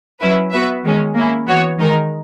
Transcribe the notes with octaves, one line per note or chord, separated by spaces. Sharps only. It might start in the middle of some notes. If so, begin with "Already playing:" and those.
F#3 C#4 E4 B4
B3 F#4 B4 E5
D#3 G#3 C#4
A#3 C#4 E4
E3 B3 F#4 C#5
D#3 G#3 D#4 A#4